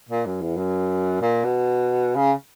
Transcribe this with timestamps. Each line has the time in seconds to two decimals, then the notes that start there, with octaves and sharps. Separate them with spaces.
0.09 A#2
0.26 F#2
0.41 E2
0.57 F#2
1.21 A#2
1.44 B2
2.16 C#3